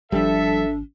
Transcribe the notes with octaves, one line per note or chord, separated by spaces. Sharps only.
G#1 F3 G3 D4 A4 E5